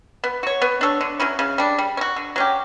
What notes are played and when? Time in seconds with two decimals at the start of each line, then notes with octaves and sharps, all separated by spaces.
0.24 B3
0.43 F#4 C#5
0.62 B3
0.81 D4 A4 C#5
1.01 D3
1.20 F#3 C#4 E4
1.39 C#3
1.58 G3 D4
1.78 G3
1.97 C#4
2.01 F#4
2.16 D3
2.36 F#3 C#4 G4